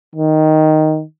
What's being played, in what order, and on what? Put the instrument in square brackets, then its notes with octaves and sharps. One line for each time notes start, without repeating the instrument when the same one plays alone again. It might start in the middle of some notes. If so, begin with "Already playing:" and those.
[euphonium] D#3